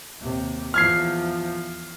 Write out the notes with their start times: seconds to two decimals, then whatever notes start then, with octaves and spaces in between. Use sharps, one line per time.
0.21 D#2 C3
0.74 E2 F3 F6 G#6 C7